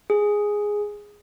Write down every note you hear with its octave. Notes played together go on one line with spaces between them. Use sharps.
G#4